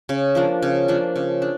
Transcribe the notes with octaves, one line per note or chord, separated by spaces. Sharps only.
C#3
F3 A#3 D4
C#3
F3 A#3 D4
C#3
D4